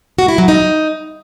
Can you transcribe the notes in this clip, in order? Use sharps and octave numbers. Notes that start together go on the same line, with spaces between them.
F#4
E4
F#3
D#4